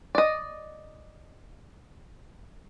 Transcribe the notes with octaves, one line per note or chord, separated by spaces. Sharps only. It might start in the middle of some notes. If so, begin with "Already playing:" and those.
D5 D#5